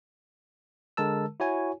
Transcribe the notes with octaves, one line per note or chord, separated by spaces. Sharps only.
D3 G#3 A#4 A5 E6
E4 F#4 C#5 G#5